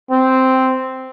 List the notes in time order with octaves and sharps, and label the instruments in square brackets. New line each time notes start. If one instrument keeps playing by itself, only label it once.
[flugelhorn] C4